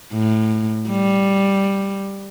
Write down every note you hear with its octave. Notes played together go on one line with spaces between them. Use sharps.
A2
G3